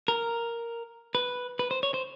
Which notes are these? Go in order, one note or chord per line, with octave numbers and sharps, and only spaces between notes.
A#4
B4
B4
C5
C#5
C5